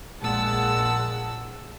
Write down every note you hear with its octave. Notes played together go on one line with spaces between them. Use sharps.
A#1 A#2 G#3 F#5 A5 E6